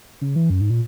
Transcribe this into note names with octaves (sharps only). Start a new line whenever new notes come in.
C#3
E3
F#2
G#2
A#2